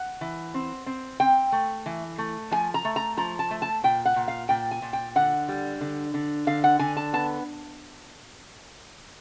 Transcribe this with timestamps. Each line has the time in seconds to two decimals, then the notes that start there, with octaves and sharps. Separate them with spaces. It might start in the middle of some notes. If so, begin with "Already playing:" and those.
Already playing: F#5
0.21 E3
0.54 C4
0.86 C4
1.20 C4 G5
1.52 A3
1.86 E3
2.18 A3
2.51 F3 G#5
2.74 A#5
2.85 A3
2.96 A#5
3.17 F3 A#5
3.39 A5
3.51 A3
3.62 A5
3.84 A#2 G5
4.05 F#5
4.16 A#2
4.28 F5
4.49 A#2 G5
4.71 G#5
4.82 A#2
4.93 G5
5.15 D3 F#5
5.48 G3
5.81 D3
6.14 D3
6.47 D3 F5
6.64 F#5
6.79 D3 G#5
6.97 A5
7.13 B3 A5